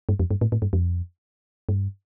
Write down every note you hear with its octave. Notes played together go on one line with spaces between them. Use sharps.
G2
F2
G2
A2
A2
G2
F2
G2